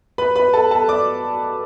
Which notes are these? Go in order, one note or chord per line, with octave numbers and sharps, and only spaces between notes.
B4 B5
B4 B5
A4 A5
A4 A5
D5 D6